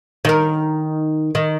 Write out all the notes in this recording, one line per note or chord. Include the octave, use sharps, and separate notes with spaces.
D#3 A#4
D#3